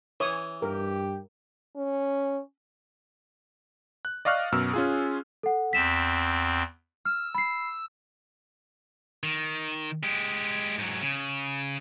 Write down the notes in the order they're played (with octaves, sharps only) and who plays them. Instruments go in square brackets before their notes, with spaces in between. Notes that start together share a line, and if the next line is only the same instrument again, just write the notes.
[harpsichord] E3 [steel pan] C#5 D#6
[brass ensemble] G2 G4 [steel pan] A#4
[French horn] C#4
[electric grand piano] F#6
D5 D#5 F5 C#6 F6 F#6
F#2 B2 E6
C#4 F4 G#4
[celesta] A4 F#5
[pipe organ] E2 C4 [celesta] B6 E7
[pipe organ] E6 [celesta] F6
[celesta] B5 C7
[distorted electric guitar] D#3
G#3 G4
G#2 F#3
C#3